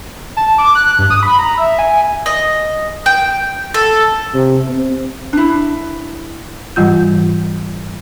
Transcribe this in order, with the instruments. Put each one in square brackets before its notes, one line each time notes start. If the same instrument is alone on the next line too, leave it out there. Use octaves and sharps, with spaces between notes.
[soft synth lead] A5
D6
F#6
G2
D#6
B5
A#5
E5
G#5
[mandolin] D#5
G5
A4
[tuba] C3
C4
[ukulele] D4 E4
[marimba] G#2 E3 G3 F4 G6